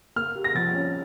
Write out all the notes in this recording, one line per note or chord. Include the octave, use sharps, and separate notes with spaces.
A#3 F6
G4
A#6
F3 A6
C#4